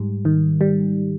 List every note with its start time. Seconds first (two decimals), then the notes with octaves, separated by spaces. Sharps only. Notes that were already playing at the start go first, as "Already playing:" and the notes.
Already playing: G#2 G3
0.25 D#3
0.61 G3